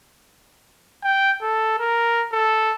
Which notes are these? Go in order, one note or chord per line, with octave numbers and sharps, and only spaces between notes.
G5
A4
A#4
A4